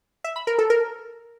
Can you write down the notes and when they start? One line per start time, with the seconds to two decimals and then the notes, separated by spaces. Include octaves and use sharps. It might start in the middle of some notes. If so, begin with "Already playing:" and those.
0.24 E5
0.36 B5
0.47 A#4
0.59 A4
0.70 A#4